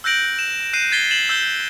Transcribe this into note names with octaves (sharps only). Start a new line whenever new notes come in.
E6 F#6 G6 A#6 D7 F#7
E7
F#6 G6 C7 D#7
G#6 A6 B6 C7 G7
A6 E7 F#7
E6 G6 G7